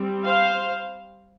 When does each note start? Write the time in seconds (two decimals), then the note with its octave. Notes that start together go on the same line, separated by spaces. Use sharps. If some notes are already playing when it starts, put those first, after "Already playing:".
Already playing: G3 C4
0.26 C5 F5